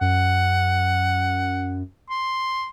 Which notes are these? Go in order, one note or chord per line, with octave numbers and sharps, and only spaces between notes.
F#2 F#5
C6